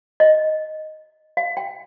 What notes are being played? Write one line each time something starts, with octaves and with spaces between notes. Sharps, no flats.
D#5
F5
G5